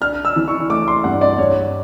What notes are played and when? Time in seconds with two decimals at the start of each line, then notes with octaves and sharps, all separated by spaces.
0.01 D4 F6
0.25 E6
0.36 E3
0.48 C#6
0.70 A3 D6
0.88 C6
1.04 G2 F#5
1.21 D5
1.38 G2 C#5